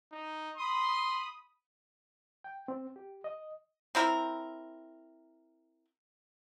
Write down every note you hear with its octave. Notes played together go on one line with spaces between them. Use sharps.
D#4
B5 C6 D#6
G5
C4
G4
D#5
C4 E4 A#4